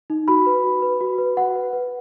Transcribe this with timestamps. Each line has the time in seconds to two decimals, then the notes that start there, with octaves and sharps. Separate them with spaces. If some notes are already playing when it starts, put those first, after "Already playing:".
0.10 D#4
0.28 F#4 B5
0.46 B4
0.64 F#4
0.82 B4
1.00 F#4
1.18 B4
1.37 F#4 F#5
1.55 B4
1.73 B4